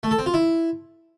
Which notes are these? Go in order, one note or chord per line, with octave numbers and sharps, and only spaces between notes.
A3
A4
C4
F4
E4